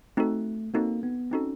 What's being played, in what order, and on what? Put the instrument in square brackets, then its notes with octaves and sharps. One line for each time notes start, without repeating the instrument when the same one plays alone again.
[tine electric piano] A3 [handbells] C4 D#4 F#4 A4
[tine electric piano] A#3 [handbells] C4 D#4 F#4 A4
[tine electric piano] B3
[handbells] C4 D#4 F#4 A4 [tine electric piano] C#4